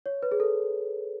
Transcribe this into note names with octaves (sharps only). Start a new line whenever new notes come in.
C#5
B4
G#4
A4